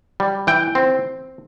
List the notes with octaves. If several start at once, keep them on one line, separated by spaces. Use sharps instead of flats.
G3
E3 G5
C4